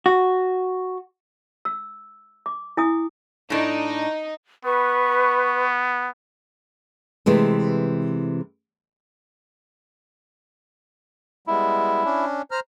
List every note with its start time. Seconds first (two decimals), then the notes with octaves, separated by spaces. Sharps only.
0.06 F#4
1.65 E6
2.46 D6
2.77 E4 G#5 D#6
3.50 A2 D4 D#4
4.65 B3 B4 C#6
7.26 C3 E3 G#3 A3
11.48 G3 G#3 B3 E4
12.04 C#4 D4
12.51 C5 A#5 F6